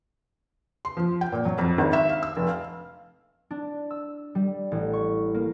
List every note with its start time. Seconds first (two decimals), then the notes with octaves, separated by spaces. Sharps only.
0.85 C6
0.97 F3
1.21 G5
1.32 A#2
1.45 F#3
1.58 F2
1.78 G#1
1.93 E5
2.09 F5
2.23 E6
2.36 F1
2.48 F5
3.51 D4
3.90 E6
4.35 G3
4.71 A1
4.93 C#6
5.34 A#3